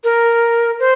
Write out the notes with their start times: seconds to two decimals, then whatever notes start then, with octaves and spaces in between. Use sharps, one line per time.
0.04 A#4
0.80 C5